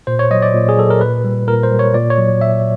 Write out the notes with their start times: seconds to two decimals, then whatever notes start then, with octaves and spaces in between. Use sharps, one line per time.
0.07 A#2 C5
0.19 C#5
0.31 F#3 D#5
0.42 D5
0.54 A#2
0.69 G#4
0.77 F#3 A4
0.90 A#4
1.01 A#2 B4
1.24 G3
1.48 A#2 A#4
1.63 C5
1.71 G3
1.79 C#5
1.94 A#2 D5
2.10 C#5
2.18 F#3
2.41 A#2 E5